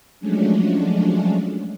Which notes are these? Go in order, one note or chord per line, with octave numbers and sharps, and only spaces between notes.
F3 F#3 G#3 A3 C#4 D4